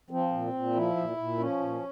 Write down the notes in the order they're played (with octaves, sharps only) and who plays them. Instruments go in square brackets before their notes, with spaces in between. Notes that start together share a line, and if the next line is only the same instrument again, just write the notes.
[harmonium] F3 C4
A#2
A#2
F3 E4
A#2
A#2
F3 C#4
A#2